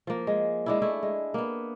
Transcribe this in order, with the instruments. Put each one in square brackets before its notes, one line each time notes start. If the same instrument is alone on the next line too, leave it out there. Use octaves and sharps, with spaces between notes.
[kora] F3 A#3
G#3
G#3 D4 E4
A3 E4
G#3
A#3 B3